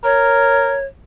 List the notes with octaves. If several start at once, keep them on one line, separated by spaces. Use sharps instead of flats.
A#4 C#5